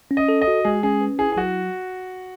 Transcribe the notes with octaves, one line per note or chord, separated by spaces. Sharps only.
C#4
D#5
A4
D#5
F#4
G#3 G#4
C#4 G#4
B4
E4 G#4
G#4
F#3 F#4